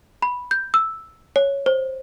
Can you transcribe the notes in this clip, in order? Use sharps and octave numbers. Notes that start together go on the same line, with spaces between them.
B5
G6
E6
C#5
C5